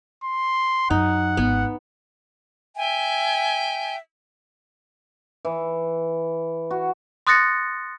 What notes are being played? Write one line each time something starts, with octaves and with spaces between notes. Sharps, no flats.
C6
F#2 D#4 F#5
G#1 B3
E5 G5 G#5
E3
F#4
C6 D#6 F#6 A6 A#6 C#7